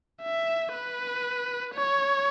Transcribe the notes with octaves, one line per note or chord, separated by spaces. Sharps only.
E5
B4
C#5